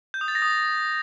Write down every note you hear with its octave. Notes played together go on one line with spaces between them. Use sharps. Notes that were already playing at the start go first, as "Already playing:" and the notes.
G6
D#6
A6
A#6
D#6